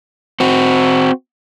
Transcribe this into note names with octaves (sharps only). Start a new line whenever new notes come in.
C4 F#4